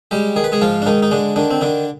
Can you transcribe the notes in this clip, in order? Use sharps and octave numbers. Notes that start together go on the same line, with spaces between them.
G3 G#3 G4
D#3 G#4
B4
G#3 G#4
G#2 F3 F4
D4
G#2 D#3 D#4
D#4
D3 G#3 D4
D3 D#3 D4
C4
D3 D#3 D4